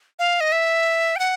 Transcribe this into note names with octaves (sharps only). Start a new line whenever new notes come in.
F5
D#5
E5
G5
F#5